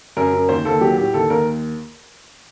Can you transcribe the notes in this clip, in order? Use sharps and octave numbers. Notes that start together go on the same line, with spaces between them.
F#2 A#4
F#2
D#2 C5
D#2 A4
F#3 G4
A2 G4
D#2 A4
D#2 A#4